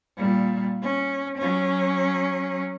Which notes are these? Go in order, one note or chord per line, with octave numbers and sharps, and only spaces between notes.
A#2 G3
C#4
F#3 C#4